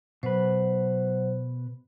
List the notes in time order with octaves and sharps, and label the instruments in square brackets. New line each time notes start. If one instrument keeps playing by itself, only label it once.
[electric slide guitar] B2 B4 [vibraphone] F#3 C5